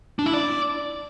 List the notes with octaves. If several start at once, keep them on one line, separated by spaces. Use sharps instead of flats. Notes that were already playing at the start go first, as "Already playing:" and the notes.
D4
E4
D5